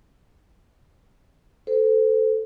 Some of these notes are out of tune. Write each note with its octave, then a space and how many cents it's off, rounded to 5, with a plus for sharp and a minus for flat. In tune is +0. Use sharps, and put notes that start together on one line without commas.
A4 +0 C5 -25